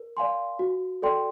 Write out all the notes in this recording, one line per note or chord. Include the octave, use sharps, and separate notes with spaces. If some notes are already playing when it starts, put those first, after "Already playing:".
Already playing: A#4
D5 F5 G#5 C6
F#4
A4 D5 G5 C6